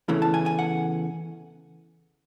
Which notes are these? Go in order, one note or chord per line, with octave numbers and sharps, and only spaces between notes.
E2 C#3 E3 A3
A5
G#5
G#5
F#5